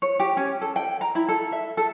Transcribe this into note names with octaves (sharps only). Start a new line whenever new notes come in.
C#5
G4
C#4
A4
G5
A#5
E4
A4
E5
A4